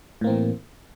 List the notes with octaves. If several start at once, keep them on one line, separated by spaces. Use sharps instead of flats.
A2 E3 A#3 C4